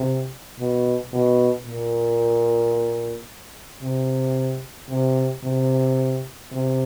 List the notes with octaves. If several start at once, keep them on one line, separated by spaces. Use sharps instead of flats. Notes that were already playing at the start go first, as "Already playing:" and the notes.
Already playing: C3
B2
B2
A#2
C3
C3
C3
C3